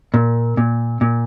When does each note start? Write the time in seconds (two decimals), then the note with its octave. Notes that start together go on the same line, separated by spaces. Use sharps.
0.14 A#2
0.57 A#2
1.01 A#2